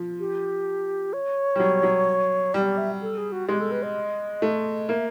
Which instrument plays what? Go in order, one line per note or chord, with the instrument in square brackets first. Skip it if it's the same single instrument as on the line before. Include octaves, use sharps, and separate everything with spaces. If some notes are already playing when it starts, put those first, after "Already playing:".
Already playing: [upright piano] F3
[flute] G4
C#5
[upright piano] G3
F#3
F#3
[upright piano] G3 [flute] D5
[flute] D5
E5
A4
G#4
F#4
[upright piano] G#3 [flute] G4
[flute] A4
B4
D#5
[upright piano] A3
[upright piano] A#3 [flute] E5